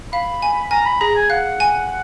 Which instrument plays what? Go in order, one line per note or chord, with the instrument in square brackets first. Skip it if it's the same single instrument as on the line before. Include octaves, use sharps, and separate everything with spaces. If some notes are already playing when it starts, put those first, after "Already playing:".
[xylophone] F5 [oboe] B5
[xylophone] G#5
[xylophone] G#5 [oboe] A#5
[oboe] B5
[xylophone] G#4 [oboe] A#5
[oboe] G#5
[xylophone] F5 [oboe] F#5
[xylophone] G#5